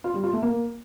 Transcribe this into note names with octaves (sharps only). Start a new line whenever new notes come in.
F4
G3
F4
A3
A#3